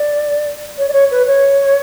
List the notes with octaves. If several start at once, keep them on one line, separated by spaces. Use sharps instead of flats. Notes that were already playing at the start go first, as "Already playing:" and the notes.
Already playing: D5
C#5
D5
C#5
B4
C#5